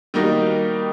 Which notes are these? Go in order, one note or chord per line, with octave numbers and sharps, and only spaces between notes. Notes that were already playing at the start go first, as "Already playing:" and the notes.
D#3 G3 A#3 D#4 F#4